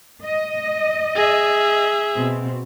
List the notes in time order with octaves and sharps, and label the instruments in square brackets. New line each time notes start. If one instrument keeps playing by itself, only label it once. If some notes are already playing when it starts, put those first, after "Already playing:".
[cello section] D#5
[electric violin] G#4 E5
[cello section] B2 C4